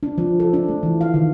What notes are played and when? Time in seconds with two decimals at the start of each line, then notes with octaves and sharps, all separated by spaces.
0.03 D4
0.18 F3
0.40 A4
0.54 D4
0.68 A3
0.83 E3
1.01 F5
1.14 D#3